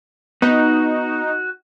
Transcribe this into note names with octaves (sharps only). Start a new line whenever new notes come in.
B3 D#4 F#4